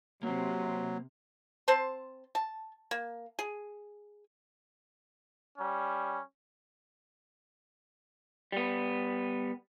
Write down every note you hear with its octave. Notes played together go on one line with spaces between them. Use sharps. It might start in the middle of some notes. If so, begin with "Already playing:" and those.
C3 F#3 A#3 C5
C4 C5 A5 C6
A5
A#3
G#4
G3 C#4
G3 B3